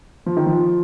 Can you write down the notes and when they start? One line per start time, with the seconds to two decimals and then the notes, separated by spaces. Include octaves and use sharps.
0.26 F3
0.37 D#3
0.46 F3